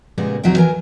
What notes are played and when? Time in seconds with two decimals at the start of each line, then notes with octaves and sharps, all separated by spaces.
0.18 A#2 C#3 G3 G#3 A#3 B3
0.43 D#2 C3 F#3 D#4 G4 G5
0.56 E3 A#4 G#5